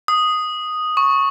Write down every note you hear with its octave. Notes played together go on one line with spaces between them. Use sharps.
D#6
C#6